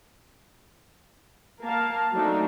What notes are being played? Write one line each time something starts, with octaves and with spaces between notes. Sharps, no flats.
A#3 A#4 F5 A5
F#3 A3 C4 D4 D#4